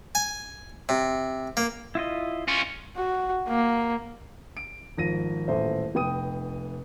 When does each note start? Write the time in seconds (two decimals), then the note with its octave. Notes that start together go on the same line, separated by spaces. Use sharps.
0.15 G#5
0.89 C3
1.57 A#3
1.95 E4 F4 D#5
2.48 C#4 F4
2.96 F#4
3.48 A#3
4.57 D7
4.97 G#1 F3 A#6 D#7
5.48 D#1 A1 A4 C5 E5
5.95 F1 B3 G5 D#6 D#7